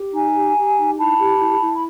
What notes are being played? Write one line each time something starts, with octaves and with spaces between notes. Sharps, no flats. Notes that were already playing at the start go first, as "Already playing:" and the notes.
Already playing: G4
D#4 G#5 A#5
G4
G4
D#4
E4 A5 B5
G4
E4
E4
B5